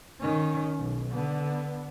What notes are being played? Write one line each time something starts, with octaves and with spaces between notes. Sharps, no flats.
D#3 C#4
B1
D3 B3